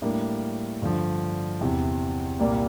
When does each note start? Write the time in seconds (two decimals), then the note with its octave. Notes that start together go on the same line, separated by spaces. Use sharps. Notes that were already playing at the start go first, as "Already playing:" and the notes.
0.02 A2 G3 A#3 D4
0.82 G2 D3 F3
1.61 E2 C3 E3
2.40 C2 A#2 G3 A#3